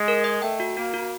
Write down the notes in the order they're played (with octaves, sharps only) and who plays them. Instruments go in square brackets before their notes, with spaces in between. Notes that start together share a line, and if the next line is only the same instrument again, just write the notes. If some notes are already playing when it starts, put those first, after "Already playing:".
Already playing: [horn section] G#3
[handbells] A#4
D#5
[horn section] A3 [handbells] G5
[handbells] F#4
[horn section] A#3 [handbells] F#4
[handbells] F#4